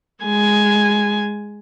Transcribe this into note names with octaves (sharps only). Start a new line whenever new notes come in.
G#3 G#5